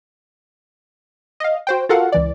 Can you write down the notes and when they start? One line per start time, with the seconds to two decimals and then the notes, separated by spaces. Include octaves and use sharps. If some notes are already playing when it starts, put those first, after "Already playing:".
1.40 D#5 F5
1.67 F#4 C5 G5
1.89 F4 F#4 A4 A#4 F5 F#5
2.12 C#2 E3 D5